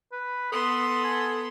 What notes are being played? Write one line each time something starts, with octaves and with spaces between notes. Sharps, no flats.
B4
B3 A4 C6 D#6
G#5